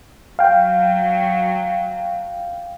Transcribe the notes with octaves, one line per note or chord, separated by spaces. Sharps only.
F#3 F5 G5